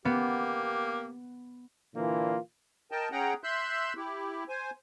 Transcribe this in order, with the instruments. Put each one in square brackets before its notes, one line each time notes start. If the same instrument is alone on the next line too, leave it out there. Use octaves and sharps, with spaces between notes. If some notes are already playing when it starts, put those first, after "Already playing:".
[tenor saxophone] A#3 [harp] B3 [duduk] G4
[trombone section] A#2 D3 E3 A#3 F4
[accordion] A#4 D#5 G5 A5
C#4 G#4 F#5 G5 A#5
E5 C6 E6 F#6 G6
E4 G4
C5 G#5